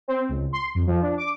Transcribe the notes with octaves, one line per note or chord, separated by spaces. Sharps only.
C4
C#2
C6
F2
F3
D4
D6